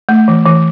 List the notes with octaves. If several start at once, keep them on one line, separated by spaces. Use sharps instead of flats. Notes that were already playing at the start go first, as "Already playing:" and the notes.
A3
E3
E3